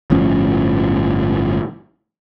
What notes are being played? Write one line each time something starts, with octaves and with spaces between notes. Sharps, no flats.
G1 A2 F3 C#4